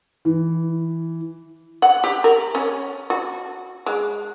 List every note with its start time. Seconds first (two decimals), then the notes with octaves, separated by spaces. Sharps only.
0.25 E3
1.82 F#5
2.04 G4
2.24 A#4
2.55 C#4
3.10 F#4
3.86 G#3